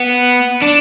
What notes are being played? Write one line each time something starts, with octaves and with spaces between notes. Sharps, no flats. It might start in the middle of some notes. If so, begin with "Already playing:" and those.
Already playing: B3
D4